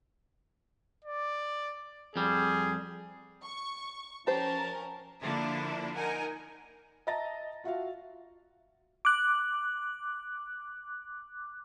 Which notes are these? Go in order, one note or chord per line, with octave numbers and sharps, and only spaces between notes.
D5
F2 G3 G#4
C#6
F3 C#4 G4 A#4 C5 A5
D3 F3 A#3 D4 E4
D#4 A#4 F#5 G#5
D#5 E5 A5 A#5 A6 A#6
F4 F#4 E5 F5
D6 F#6